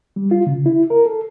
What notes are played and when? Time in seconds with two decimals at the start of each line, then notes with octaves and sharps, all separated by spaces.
0.16 G3
0.31 F4
0.47 C#3
0.66 E4
0.90 A#4
1.06 A4